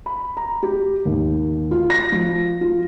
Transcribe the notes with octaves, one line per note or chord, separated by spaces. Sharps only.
B5
A#5
G4
D#2
F4
A#6
F3
F4